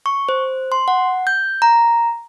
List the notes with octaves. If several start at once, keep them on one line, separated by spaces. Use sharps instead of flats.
C#6
C5
C6
F#5
G6
A#5